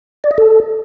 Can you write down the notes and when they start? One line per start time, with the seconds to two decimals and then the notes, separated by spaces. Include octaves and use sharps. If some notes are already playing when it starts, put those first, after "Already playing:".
0.24 D5
0.31 D#5
0.38 A4